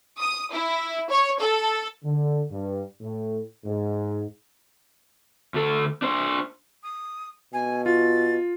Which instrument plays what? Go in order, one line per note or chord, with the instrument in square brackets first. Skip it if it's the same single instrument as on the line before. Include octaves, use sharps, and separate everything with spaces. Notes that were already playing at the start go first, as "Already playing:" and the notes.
[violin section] D#6
E4
C#5
A4
[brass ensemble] D3
G2
A2
G#2
[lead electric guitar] D2 A4
D4 C5
[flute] D#6
[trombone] B2 [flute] G#5
[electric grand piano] F4 [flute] A6